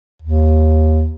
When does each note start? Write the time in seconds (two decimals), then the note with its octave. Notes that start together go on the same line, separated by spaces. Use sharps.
0.22 D#2